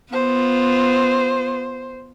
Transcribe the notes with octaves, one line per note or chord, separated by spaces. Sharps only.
B3 F4 C5